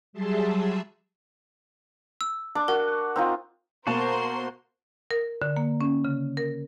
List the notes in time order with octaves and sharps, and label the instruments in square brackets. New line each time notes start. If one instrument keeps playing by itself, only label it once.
[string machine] F#3 G3 G#4 E5 A5 C6
[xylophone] E6
[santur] D4 D6
[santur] F#4 [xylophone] A#4
[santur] C4 D#4 F4
[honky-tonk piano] B2 A#3 A5 [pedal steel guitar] F#4 [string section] A#4 C5 C6
[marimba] A#4
D3
A#3
C#4
C#3
A#4